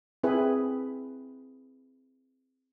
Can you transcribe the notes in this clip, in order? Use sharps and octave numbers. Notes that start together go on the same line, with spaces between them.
C4 E4 G#4 B4